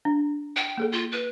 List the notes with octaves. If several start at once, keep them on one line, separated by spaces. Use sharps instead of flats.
D4
G5
A#3 G#4 A4
F4
B4